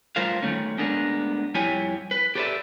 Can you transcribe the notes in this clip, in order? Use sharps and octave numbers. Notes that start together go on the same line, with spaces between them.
G3 A3 F4 A#4 C5 F5
D#3 G#3 A3 C#4
G#3 A3 B3 D4 A#4
F2 G3 E4 G4 C#5 G#5
B4
G4 A4 B4 C#5 D5 E5